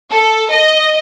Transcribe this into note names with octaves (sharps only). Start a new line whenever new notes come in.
A4
D#5